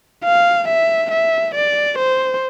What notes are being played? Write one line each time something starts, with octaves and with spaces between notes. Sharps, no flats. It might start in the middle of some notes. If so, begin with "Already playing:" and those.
F5
E5
E5
D5
C5